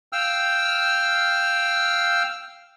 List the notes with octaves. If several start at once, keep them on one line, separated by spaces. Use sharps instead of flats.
F5 G5 E6 F6